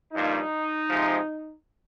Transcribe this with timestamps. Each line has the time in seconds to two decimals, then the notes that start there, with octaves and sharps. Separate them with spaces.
0.12 G2 F3 A#3 D#4
0.89 C3 F3 G#3